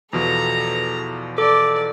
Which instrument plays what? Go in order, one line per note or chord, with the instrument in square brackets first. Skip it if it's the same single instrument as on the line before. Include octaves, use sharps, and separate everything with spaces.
[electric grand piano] E2 B2 F3 [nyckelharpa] A4 A#5
[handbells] A4 D6 [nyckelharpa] D5